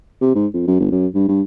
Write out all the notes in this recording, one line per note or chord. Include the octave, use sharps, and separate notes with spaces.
C3
G#2
F2
F#2
G1
F#2
G2
G2